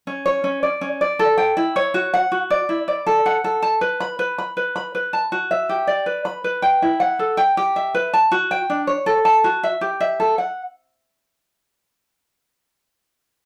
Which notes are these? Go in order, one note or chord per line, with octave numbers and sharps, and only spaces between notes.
C#4
C#5
C#4
D5
C#4
D5
A4
G5
E4
C#5
F#4
F#5
F#4
D5
E4
D5
A4
F#5
A4
A5
B4
B5
B4
B5
B4
B5
B4
A5
F#4
E5
G4
D5
B4
B5
B4
G5
E4
F#5
A4
G5
G4
E5
B4
A5
F#4
G5
D4
C#5
A4
A5
F#4
E5
G4
E5
A4
F#5